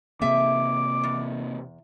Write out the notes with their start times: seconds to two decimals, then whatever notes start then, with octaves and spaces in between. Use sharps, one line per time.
0.22 E2 C3 A#3 C4 G#4 E5 D6
1.04 E2